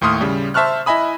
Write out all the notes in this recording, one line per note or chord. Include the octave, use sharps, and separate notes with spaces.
D#2 A2 A3 C6 D#6 F6
C#3 G3
C5 E5 A5 C#6 F6 F#6
E4 D#5 E5 G#5 B5 D#6